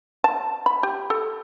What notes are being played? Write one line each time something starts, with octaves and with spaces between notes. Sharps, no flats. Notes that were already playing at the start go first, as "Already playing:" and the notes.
A5
B5
G4
A4